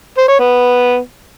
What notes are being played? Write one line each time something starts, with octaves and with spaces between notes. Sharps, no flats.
C5
C#5
B3